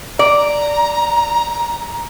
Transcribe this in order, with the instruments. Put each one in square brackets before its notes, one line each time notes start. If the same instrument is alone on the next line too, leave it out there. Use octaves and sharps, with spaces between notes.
[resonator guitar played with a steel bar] D5 [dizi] A#5